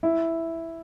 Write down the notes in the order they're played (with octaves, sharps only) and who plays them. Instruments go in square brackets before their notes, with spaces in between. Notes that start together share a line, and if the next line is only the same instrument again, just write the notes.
[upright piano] E4